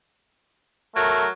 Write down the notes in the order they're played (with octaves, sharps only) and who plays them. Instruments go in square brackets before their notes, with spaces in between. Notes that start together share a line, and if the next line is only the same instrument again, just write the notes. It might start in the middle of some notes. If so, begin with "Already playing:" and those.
[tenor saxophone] F#3 [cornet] A3 [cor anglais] A#4